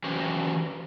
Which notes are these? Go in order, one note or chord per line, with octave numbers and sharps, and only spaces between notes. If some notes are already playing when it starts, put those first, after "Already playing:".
E3 C#4 F#4 G4 C5